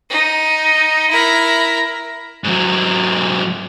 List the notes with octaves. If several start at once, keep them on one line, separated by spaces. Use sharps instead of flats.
D#4
E4 A#4
G#2 F#3